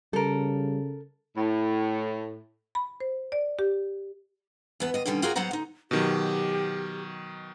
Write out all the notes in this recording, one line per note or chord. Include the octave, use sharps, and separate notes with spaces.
C#3 G3 A4 A#4
A2
B5
C5
D5
G4
E2 B3
D#2 D#5
B2 D3 D#3 G3 C#4
C4 F4 F#4 G#4 A#4
F#3 B3 C5 F#5 A#5
D2 D#4
B2 D#3 F#3 G4